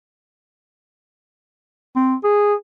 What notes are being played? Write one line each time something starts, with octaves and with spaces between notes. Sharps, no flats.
C4
G#4